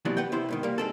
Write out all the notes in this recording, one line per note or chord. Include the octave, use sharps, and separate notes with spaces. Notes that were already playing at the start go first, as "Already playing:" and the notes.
D#2 C3 E3 F#3 B3 D4
B4 F#5 G5
C3 B3 E4 C5
G#2 B2 D#3
G3 A#3
G#3 C4 A4